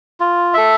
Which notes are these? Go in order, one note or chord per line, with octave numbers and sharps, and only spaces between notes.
F4
A4 E5